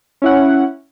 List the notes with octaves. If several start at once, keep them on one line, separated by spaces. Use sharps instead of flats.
C#4 E4 F#5